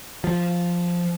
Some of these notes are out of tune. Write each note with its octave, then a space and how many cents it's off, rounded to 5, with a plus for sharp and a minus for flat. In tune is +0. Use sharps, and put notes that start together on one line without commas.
F3 +0